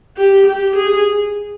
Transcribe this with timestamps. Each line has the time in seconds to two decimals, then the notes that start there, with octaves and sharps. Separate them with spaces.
0.17 G4
0.46 G4
0.76 G#4